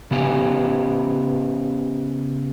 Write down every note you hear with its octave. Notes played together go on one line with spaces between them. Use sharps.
C#3 B3 G4 F5 G#5